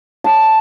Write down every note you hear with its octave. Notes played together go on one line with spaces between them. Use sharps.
A5